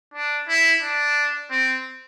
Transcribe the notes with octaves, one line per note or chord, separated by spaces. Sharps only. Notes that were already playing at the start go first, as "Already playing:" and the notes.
D4
E4
D4
C4